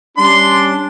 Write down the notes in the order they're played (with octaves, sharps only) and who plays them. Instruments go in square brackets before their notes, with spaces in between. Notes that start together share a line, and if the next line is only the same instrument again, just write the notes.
[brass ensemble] G3 C#4 D4 [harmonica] C6